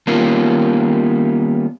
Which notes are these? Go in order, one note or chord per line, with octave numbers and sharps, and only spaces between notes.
D#3 G3 A#3 B3 C#4 F4